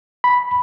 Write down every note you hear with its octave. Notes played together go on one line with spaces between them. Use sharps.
B5